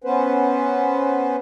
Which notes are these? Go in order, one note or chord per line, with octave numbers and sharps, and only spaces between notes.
B3 C#4 B4 C5